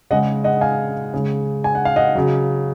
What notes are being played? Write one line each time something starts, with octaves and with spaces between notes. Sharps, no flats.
C#3 G#3 D#5 F#5
D#5 F#5
F5 G#5
C#3 G#3
G#5
F#5
F5
D#5 F#5
C#3 F#3